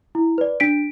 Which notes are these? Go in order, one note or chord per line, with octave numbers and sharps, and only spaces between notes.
E4
B4 D5
D4 B6 D7